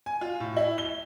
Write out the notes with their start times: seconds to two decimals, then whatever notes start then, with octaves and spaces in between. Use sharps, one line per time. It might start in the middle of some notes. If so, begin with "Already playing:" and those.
0.06 G#5
0.21 F4
0.40 A2
0.57 E4
0.78 G7